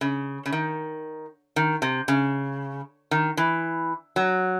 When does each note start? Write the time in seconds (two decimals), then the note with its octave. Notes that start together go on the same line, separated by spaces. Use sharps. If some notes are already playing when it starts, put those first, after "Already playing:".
0.01 C#3
0.46 C#3
0.52 D#3
1.56 D#3
1.82 C3
2.08 C#3
3.11 D#3
3.37 E3
4.16 F#3